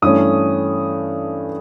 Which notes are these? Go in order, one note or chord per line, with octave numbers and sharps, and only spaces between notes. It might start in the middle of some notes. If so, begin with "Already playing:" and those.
G2 E3 A3 C#4 D#6